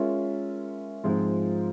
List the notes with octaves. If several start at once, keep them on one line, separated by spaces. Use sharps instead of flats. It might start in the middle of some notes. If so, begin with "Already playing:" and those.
Already playing: G#3 C#4 F4 A#4 E5
G#2 F3 G#3 C4 F4